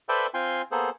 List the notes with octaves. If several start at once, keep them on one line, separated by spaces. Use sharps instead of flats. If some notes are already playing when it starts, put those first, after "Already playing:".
A4 B4 C5 D5 E5 G5
C4 F4 G5 G#5 C6
A#3 B3 G#4 A4 C5